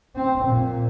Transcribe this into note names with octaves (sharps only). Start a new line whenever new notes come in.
C4
A#2